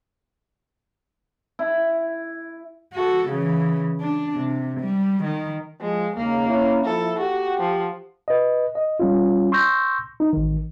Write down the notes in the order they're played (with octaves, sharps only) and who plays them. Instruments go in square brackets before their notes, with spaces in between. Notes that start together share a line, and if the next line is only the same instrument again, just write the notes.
[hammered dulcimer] E4
[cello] F#4 A4
C#3 E3
D4
C3
G3
D#3
[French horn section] F3 [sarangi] G#3
[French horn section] D#2 C#3 [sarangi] A#3
[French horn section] C#4 E4
[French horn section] F3 E4 [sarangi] A4
[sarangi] F#4 [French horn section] G4
[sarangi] F3
[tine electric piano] B4 D#5
D#5
G3 C#4 F4
C6 C#6 E6 G6 A#6
D#4
A1 D#3